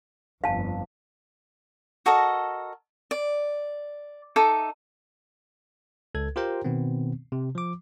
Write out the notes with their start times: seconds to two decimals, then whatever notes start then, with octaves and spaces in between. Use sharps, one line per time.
0.44 G1 F2 F5 A5
2.06 F#4 A4 A#4 D#5
3.11 D5
4.36 D#4 A4 E5 D6
6.15 C#2 A4 G#6
6.36 F4 G4 A#4 C5 G5 A#5
6.65 B2 D#3 B3 C4
7.32 C3
7.55 F3 D6